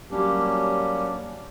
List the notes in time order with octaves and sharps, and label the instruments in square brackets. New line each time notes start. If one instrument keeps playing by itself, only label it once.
[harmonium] F#3 G3 A#3 C#4 D4 G4